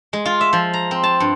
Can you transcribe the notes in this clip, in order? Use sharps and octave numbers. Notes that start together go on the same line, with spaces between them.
G#3
F4
E5
F3
A#5
C4
A5
G2